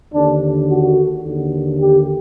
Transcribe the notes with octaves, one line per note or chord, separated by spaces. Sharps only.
D#2 D3 D4
F#4
D#2 D3
G4